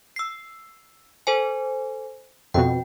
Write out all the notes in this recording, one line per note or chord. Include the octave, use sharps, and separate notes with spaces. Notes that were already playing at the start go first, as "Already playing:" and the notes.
E6 C7
A4 C5 G#5
F2 B2 G5